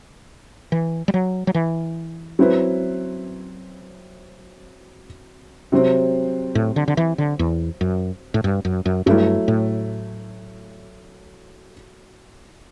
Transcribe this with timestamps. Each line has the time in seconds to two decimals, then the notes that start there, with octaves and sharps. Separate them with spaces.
0.72 E3
1.08 G3
1.14 F#3
1.47 F#3
1.55 E3
2.39 F#3 C4 E4 B4
5.72 C3 F#3 C4
6.55 A2
6.76 D3
6.88 D3
6.97 E3
7.18 D3
7.39 E2
7.81 F#2
8.34 A2
8.44 G2
8.65 F#2
8.86 F#2
9.06 G2 F#3 A3 E4
9.48 A2